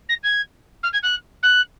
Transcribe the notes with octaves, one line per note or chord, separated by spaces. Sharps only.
A#6
G#6
F6
G#6
F#6
F#6